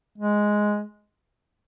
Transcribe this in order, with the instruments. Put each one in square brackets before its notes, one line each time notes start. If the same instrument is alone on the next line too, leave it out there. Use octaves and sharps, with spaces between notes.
[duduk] G#3